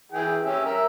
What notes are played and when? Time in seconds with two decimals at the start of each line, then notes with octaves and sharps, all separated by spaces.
0.12 E3 G#4 G5
0.43 C#4 G4 E5
0.65 A#4 E5